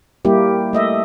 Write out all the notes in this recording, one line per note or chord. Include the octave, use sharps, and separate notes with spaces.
G3 A#3 E4 G4
A3 D#5 E5